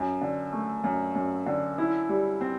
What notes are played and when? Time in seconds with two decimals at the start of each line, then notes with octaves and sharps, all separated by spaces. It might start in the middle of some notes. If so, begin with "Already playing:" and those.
Already playing: F#2
0.21 D3
0.53 A3
0.84 F#2
1.15 F#2
1.46 D3
1.78 E4
2.09 G3
2.41 C4